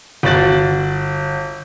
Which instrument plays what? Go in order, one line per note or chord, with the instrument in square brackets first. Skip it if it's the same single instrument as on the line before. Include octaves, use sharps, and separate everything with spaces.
[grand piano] G1 F#4 A6 F#7